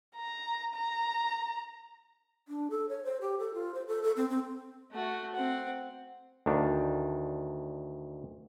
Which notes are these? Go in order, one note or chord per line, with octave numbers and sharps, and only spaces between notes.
A#5
A#5
D4
A4
C#5
C5
G4
A4
F4
C5
A4
A4
C4
C4
A3 F#4
C4 F#5
D2 D#3 D4